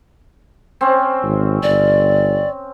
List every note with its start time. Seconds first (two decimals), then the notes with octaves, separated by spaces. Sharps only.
0.81 C4 C#4
1.23 G#1
1.63 G1 D5